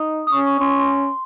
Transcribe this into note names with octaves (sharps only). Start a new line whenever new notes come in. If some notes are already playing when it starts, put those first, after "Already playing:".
Already playing: D#4 D#6
D#6
C#4 C#6
C#6
C#4 C6
C#6
C6